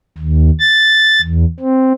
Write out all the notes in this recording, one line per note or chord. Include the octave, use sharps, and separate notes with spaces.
D#2
A6
E2
C4